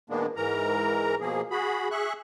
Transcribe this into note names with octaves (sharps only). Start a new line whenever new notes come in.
A#2 D#3 G#3 A#3 B3 D4
G#2 E3 A#4 A#5
B2 F3 A#3 G#4
F#4 G#4 B5
G#4 E5 C#6 F#6